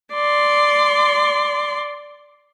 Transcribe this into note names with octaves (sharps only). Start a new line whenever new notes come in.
D5 C6